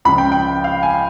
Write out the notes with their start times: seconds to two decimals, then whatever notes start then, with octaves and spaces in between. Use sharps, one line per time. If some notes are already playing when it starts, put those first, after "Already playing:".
0.05 C#2 C#3 F3 B5
0.18 G5
0.32 G5
0.64 F5
0.83 G#5